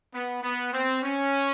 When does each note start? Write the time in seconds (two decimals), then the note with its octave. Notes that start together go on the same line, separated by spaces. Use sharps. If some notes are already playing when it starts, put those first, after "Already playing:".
0.13 B3
0.42 B3
0.72 C4
1.02 C#4